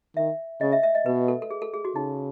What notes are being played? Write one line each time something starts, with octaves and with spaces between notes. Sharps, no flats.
D#3 E5
C#3 D#5
E5
E5
D#5
B2 B4
A4
A4
G#4
A4
G#4
F#4
C#3 D#4